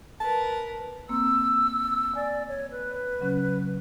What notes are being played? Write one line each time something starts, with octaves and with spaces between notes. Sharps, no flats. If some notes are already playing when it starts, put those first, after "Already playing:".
A#4 B4 A5
A#3 C4 E6
D5 G#5
C#5
B4
C#3 F#3 C#4